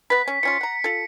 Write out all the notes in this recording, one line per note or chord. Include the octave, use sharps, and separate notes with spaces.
B3 B4 B6
C#4
F3 C#4 F4 C#7
F#5 A#5
F4 A4